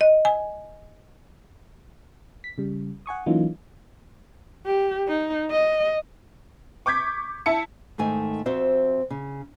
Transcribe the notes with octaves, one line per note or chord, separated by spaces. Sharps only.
D#5
G#5
B6
C#3 G3
F#5 G#5 C#6 D#6
E3 F#3 A#3 C#4 D#4 F4
G4
D#4
D#5
C#6 D6 G6 G#6 B6
E4 A5 C#7
G#2 D#3 A3 G#5
F2 C4 F#4 C5 E5
C#3